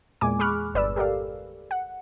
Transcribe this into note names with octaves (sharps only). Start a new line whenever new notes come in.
E2 A#2 G#3 G#5 D6
G#4 B5 C#6 D6 F6 F#6
G1 B4 D5 E6
G4 A4 A#4 D5 F5
F#5